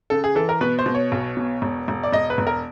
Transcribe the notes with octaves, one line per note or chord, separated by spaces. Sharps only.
C#3 A4
G#4
E3 A4
A#4
B2 B4
C5
B2
C#5
B1
B2
E1
E1
D5
E1 D#5
B4
E1
A#4